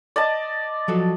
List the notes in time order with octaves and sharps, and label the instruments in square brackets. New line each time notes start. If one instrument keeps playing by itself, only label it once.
[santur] D5 D#5 A5
[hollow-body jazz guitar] F3 F#3 A4